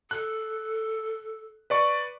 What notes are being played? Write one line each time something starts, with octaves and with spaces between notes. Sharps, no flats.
A4 F#6
B4 D5 C#6